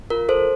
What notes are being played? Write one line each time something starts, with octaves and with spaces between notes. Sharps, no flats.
F4 A#4
A4 C5